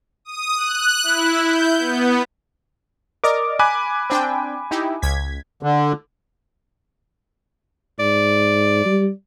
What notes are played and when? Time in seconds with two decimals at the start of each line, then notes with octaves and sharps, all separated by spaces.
0.25 D#6
0.57 F#6
1.03 E4
1.45 G6
1.79 B3
3.24 A#4 D5 D#5 D6
3.59 G#5 B5 D6 F#6
4.10 C4 D4 G5
4.71 D#4 E4 G4
5.02 C#2 G#6 B6
5.63 D3
7.99 G#2 D5
8.85 G3